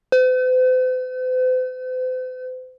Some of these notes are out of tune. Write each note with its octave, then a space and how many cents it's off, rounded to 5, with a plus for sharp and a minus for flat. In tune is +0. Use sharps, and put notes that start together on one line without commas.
C5 -45